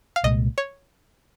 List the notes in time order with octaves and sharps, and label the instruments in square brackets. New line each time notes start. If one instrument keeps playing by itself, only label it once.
[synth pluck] F5
[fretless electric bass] C2 A#2 G#3 [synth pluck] D#5
[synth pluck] C#5